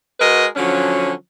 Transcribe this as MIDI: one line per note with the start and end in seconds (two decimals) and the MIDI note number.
0.20 0.47 56
0.20 0.47 66
0.20 0.47 70
0.20 0.47 71
0.20 0.47 75
0.57 1.13 50
0.57 1.13 53
0.57 1.13 54
0.57 1.13 61